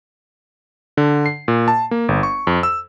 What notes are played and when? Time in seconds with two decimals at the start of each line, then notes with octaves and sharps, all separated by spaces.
0.97 D3
1.26 C7
1.48 A#2
1.68 A5
1.91 A#3
2.08 G1
2.23 C#6
2.47 F2
2.63 E6